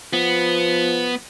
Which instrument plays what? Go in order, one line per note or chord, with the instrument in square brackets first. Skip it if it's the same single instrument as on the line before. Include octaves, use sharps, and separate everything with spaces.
[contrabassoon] F3 [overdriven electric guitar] B3